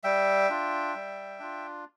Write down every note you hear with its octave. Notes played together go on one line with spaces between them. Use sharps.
G3 E5 G5
D4 F4
G3
D4 F4